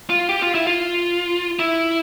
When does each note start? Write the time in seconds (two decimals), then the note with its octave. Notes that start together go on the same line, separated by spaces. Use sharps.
0.10 F4
0.29 G4
0.42 F4
0.55 E4
0.67 F4
1.59 E4